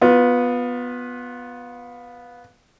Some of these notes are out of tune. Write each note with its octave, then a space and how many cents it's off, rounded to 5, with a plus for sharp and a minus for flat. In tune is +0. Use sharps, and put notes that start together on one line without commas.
B3 +0 F4 +25